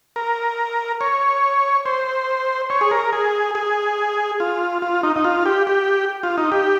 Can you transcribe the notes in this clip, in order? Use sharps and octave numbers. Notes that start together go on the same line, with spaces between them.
A#4
C#5
C5
C#5
G#4
A#4
G#4
G#4
F4
F4
D#4
D#4
F4
G4
G4
F4
D#4
G4